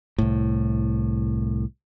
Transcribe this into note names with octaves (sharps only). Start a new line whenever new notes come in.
C2 A2